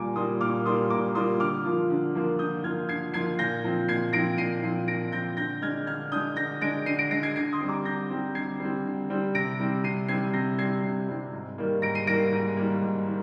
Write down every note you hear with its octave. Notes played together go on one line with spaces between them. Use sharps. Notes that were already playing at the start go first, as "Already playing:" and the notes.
Already playing: A#2 G3 A#3 F4 G#5 A#5 D6
G3 A#3 F4 C6 D#6
A#2 D6 F6
G3 A#3 F4 C6 D#6
A#2 A#5 D6
G3 A#3 F4 C6 D#6
D3 D6 F6
F3 A#3 F4
D3
F3 A#3 F4
D3 D#6 G6
F3 A#3 F4 F6 G#6
D3 G#6 C7
F3 A#3 F4 G#6 C7
A#2 G6 A#6
F3 C4
A#2 G#6 C7
F3 C4 A#6 D7
A#2 C7 D#7
F3 C4
A#2 A#6 D7
F3 C4 G6 A#6
D3 G6 A#6
G#3 D4 F6 G#6
D3 F6 G#6
G#3 D4 D#6 G6
D3 G6 A#6
G#3 D4 A#6 D7
D3 C7 D#7
A#6 D7
G#3 D4 A#6 D7
G#6 C7
D3 G#6 C7
C6 D#6
G3 C4
A#5 D6
D3 G6 A#6
G3 C4
D3 G#6 C7
G3 C4
D3
G3 C4
C3 A#6 D7
G3 C4
C3 C7 D#7
G3 C4 G#6 C7
C3 G6 A#6
G3 C4 G#6 C7
C3
G3 C4
G#2
D#3 G3 A#3
G#2 A#6 D7
C7 D#7
D#3 G3 A#3 A#6 D7
G#2
D#3 G3 A#3
G#2
D#3